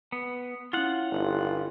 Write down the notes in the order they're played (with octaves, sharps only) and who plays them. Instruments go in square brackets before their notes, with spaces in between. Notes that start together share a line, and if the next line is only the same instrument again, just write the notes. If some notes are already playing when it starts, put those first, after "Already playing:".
[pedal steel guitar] B3
[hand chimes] C#4 E4 [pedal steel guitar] F4 F#5
[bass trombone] G1